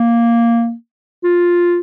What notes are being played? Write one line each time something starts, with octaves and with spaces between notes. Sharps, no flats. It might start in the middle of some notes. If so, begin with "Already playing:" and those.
Already playing: A#3
F4